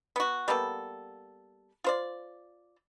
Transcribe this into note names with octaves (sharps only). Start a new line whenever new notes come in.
B3 F#4
G3 A#3 B3 A4
F4 C5 D5